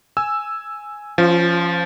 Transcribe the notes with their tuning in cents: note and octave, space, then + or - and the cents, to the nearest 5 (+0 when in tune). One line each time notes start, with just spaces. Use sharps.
G#5 +0 E6 +0
F3 -15 C#4 +0 F4 +30